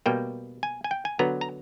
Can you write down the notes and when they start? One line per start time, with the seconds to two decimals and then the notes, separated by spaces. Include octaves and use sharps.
0.06 B2 G3 A#3 G5
0.63 G#5
0.84 G#5
0.91 G5
1.05 G#5
1.19 D3 F#3 B3 A#5
1.41 A#5